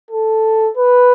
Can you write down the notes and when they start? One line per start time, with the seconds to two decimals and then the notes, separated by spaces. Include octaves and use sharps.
0.11 A4
0.77 B4